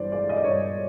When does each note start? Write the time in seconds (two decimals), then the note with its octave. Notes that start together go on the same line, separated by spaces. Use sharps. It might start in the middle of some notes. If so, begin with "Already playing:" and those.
Already playing: G1 G2 E3 C5 D5
0.12 G#3 D5
0.29 D#5
0.36 D5
0.43 G2 C#5